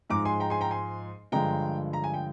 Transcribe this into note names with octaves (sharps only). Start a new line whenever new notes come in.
G#2 F3 G#3 A#5 D6
G#5 C6
G5 A#5
G#5 C6
G5 A#5
G#5 C6
G2 D3 F3 G#3 G5 A#5
A#5
G#5
G5